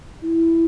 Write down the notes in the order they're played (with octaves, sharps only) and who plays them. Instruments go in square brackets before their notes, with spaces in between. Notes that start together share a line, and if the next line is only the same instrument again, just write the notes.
[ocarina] E4